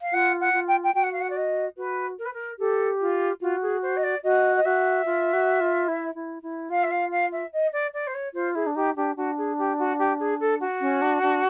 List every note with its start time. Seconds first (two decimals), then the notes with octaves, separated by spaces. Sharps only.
0.01 F5
0.12 F4 F#5
0.40 F#5
0.53 F4
0.67 G5
0.83 G5
0.94 F#4 G5
1.03 F#5
1.12 F5
1.21 F#5
1.30 D5
1.36 D#5
1.77 F#4 B4
2.18 A#4
2.25 B4
2.33 A#4
2.59 G4 A4
3.00 F4
3.41 F4 F#4
3.62 G#4
3.82 C5
3.96 D#5
4.03 D5
4.23 F#4 D#5
4.56 D#5
4.65 F#4 E5
5.05 F4
5.33 F#4
5.61 F4
5.88 E4
6.15 E4
6.43 E4
6.70 F4 F5
6.83 E5
6.91 F5
7.11 F5
7.32 E5
7.53 D#5
7.72 D5
7.93 D5
8.07 C5
8.14 C#5
8.34 F4 C5
8.55 E4 G#4
8.67 D4
8.75 D#4 G4
8.96 D4 G4
9.16 D4 F#4
9.37 G#4
9.58 G4
9.78 F#4
9.98 G4
10.19 G#4
10.40 A4
10.60 F#4
10.81 C#4
11.02 D4
11.22 D4